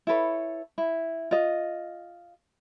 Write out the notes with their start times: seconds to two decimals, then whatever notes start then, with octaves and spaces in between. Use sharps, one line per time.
0.07 E4 A4 B4 C#5
0.78 E4
1.31 F4 D#5